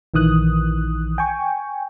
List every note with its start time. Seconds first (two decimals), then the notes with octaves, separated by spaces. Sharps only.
0.14 A#1 D#3 E3 D#6 F#6
1.18 G5 G#5 C#6